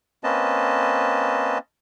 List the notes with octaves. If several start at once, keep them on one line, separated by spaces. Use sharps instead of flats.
A#3 C4 C#4 B4 D#5 A5